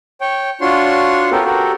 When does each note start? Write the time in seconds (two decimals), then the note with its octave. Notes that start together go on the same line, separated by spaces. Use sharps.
0.21 C#5 G5
0.61 D4 F4 F#4 C#5 C6
1.31 B3 C#4 G4 A4 A#4
1.44 F#4 G4 A4 A#4